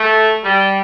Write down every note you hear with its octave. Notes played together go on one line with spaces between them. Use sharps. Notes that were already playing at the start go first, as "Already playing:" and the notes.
Already playing: A3
G3